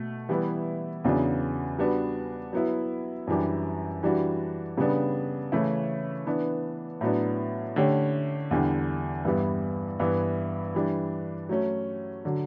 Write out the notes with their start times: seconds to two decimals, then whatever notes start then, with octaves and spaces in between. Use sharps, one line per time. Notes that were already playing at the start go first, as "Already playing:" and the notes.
Already playing: B2 A3
0.29 E3 G3 B3 E4 B4
1.04 E2 C#3 F#3 B3 D4
1.78 G3 B3 D4 F#4 B4
2.53 F#3 B3 E4
3.27 F#2 E3 G3 D4 G4
4.03 E3 G3 D4 F#4
4.78 C#3 G3 B3 D4
5.52 C#3 E3 A3 C#4 E4
6.26 E3 B3 D4
7.01 A2 F#3 B3 D4
7.76 D3 A3 C#4 G4 C#5
8.51 E2 D3 G3 D4 G4
9.25 G2 E3 G3 B3 E4
10.00 G2 E3 B3 E4
10.75 E3 G3 D4
11.49 F#3 A3 C#4
12.25 D3 F#3